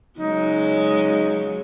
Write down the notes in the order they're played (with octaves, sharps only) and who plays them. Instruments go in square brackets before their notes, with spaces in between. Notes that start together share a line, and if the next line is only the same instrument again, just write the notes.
[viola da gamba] C#3 F#3 G#3 [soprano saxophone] D#4